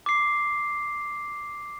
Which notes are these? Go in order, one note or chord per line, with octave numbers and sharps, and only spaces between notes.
D6 C7